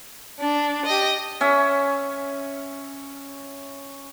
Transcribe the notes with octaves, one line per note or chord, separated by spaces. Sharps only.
D4
G4 D#5
C#4 E5